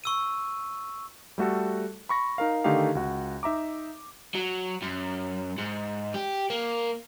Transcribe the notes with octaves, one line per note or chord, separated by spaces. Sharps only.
C#6 E6 D#7
G3 A3 F#4 A4
B5 C#6 A#6
D#4 A#4 F5
D3 D#3 A3 D#4 G4 F5
C#2 F#4
D#4 E5 A#5 D6
F#3
F#2
G#2
G4
A#3